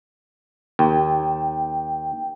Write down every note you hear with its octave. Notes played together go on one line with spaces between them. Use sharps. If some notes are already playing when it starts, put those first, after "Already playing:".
D#2 G5